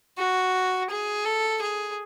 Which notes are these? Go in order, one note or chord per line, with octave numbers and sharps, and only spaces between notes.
F#4
G#4
A4
G#4